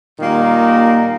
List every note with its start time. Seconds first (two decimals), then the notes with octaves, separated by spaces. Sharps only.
0.19 A#2 D#3 G3 A#3